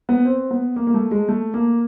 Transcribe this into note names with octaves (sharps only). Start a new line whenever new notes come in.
B3
C4
B3
A#3
A#3
A3
G#3
A3
A#3